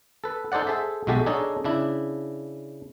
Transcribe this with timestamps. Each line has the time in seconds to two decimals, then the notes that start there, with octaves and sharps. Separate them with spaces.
0.24 A4 B4
0.52 D#4 A4 C5 D5 F#5
0.67 G#4 A4 C5 E5
1.07 B1 G#3 F#4 G4 A4 E5
1.26 D4 D#4 G#4 A4 C#5 D#5
1.64 C#3 D4 E4